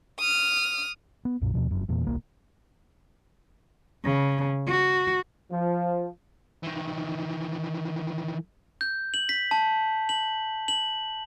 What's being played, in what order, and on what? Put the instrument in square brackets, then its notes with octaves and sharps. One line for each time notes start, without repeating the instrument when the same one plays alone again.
[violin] D#6 F6
[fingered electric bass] B3
B1 F#2 A#2
D#2 B2 F3
F1 F#2
E2 A#2
D#1 B1 A#3
[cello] C#3
F#4
[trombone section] F3
[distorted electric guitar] D#3 E3
[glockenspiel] G6
F#7
B6
A5
F#7
F#7